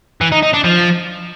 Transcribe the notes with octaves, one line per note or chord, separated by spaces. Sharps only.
E3
D#4
D#4
D4
F3